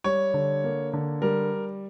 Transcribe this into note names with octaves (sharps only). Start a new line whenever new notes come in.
G3 C#5
D3
A#3
D3
G3 A#4